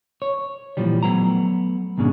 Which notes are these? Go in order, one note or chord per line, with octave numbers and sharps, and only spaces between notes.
C#5
A#2 E3 F3 G3
F#3 A3 B3 A#5
D#2 G#2 B2 G#3 C#4 D4